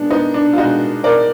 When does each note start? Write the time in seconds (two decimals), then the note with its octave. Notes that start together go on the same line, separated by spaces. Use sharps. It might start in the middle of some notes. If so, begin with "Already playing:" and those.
Already playing: G#3 B3 D4
0.10 B3 D#4
0.34 D4
0.53 F4
0.57 B2 G#3 D#4 F#4
1.04 A#4 D5